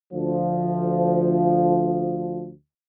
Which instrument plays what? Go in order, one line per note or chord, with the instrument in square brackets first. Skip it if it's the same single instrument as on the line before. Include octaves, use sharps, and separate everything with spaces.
[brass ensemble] D2 F3